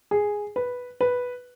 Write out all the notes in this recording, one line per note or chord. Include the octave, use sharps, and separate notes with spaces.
G#4
B4
B4